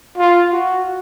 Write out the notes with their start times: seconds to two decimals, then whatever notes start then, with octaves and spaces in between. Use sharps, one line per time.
0.17 F4
0.53 F#4